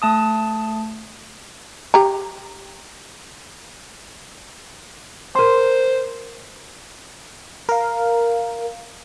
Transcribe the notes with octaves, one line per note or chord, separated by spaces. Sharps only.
A3 A5 D#6
G4 A#5
A#4 C5 C6
A#4 F5